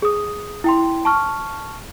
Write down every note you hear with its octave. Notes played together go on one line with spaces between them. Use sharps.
G#4 D#6
E4 G5 C6
A5 C#6 F6